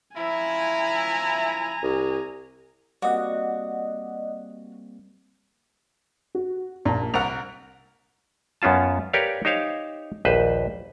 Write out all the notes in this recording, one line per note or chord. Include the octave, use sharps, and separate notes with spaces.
F3 E4 G#5 A#5
C2
G3 A#3 C4 F#4 D5 D#5 F#5
F#4
A#1 A#2 A5
C2 A#4 F#5 F7
F#2 B3 C#4 F4 A5
G4 A#4 B4 C#5 D5 F5
D#4 G4 C5 C#5 F5
A#1 D#2 B4 C5